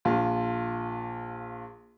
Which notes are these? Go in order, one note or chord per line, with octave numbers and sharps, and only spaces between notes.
A#1 F4